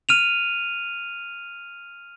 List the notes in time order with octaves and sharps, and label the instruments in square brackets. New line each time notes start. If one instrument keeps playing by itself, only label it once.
[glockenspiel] F6 D#7 F7